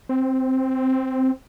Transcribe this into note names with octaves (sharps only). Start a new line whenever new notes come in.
C4